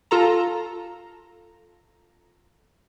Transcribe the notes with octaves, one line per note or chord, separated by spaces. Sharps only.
F4 A4 A#5